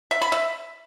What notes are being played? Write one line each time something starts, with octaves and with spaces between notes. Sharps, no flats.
E5
B5
E5